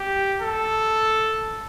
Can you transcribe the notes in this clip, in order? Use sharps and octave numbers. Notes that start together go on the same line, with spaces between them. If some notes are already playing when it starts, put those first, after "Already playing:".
Already playing: G4
A4